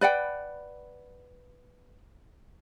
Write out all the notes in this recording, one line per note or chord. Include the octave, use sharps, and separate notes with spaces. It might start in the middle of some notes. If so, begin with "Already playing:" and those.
B4 D5 F#5 G5